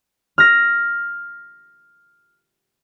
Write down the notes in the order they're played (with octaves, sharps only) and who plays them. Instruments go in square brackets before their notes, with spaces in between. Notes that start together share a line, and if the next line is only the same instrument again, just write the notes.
[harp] F6 A#6